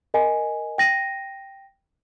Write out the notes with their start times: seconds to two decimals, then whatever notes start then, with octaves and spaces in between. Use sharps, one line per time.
0.14 A#4 D#5 G#5
0.78 G5 A#6 D#7